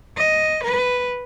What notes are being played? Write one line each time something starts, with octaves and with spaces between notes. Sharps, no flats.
D#5
B4